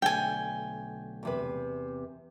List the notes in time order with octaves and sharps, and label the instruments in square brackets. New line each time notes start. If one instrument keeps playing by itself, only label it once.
[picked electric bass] B1 D3 A3 [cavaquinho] G5 G#5
[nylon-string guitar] E2 C3 B4